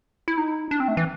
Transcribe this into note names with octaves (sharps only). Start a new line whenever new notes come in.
E4
D#4
D4
C4
A3
E3